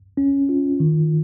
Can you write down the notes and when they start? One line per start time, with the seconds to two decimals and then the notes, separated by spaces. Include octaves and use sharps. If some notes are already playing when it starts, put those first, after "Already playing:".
0.17 C#4
0.49 F4
0.80 D#3